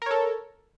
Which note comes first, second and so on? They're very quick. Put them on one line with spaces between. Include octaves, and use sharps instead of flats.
A#4 C#5 A4